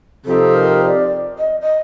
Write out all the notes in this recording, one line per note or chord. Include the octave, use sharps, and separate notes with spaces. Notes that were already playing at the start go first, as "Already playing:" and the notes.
C3 F3 C4 D#4 G4 A4
A#4
D5
D#5
D#5